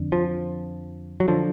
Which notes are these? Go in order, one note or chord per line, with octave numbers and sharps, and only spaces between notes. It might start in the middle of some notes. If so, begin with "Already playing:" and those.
Already playing: F2 D3
F3
F#3
D3 F3